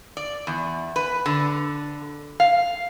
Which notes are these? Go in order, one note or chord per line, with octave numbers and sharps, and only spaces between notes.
D5
E2
B4
D3
F5